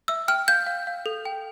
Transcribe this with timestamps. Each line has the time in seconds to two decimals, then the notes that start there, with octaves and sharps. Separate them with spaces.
0.08 E5 E6
0.28 G5 F6
0.48 F5 G6
0.67 F5
0.87 F5
1.06 A4
1.25 G5